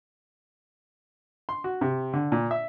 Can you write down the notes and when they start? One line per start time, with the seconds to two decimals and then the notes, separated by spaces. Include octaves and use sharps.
1.49 C6
1.64 F#4
1.81 C3
2.13 D3
2.32 A#2
2.51 E5